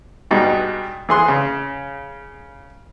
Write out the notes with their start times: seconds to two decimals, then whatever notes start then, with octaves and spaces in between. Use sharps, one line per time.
0.31 G2 B2 G#3 D#4
1.09 E3 G#4 C6 F#6
1.28 C#3